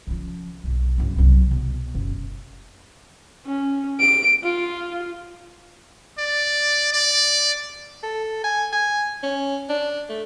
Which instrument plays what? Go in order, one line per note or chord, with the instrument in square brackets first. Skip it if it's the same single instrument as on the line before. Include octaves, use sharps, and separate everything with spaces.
[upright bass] C#3 F3
B1 A#3
F#1 A2
C2 F#3
B2
F#1
[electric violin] C#4
D7
F4
[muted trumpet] D5
D5
[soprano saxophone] A4
G#5
G#5
C#4
D4
A3